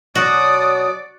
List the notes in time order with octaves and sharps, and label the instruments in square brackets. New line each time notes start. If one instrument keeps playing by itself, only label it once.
[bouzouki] B2 F#3 [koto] F#4 [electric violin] D5 D6 [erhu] D#6